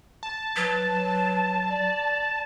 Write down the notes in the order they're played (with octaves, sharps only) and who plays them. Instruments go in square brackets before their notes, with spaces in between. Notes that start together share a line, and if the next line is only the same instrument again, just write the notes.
[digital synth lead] A5
[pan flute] F#3 [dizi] B4
[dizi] D5